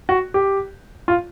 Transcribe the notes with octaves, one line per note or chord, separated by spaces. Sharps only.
F#4
G4
F4